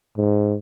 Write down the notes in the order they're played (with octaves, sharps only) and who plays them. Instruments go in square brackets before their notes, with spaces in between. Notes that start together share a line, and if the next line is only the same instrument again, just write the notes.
[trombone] G#2